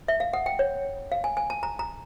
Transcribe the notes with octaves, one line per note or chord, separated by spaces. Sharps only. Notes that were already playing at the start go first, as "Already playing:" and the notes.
E5
F5
F#5
G5
C#5
F5
G#5
G#5
A5
A#5
A#5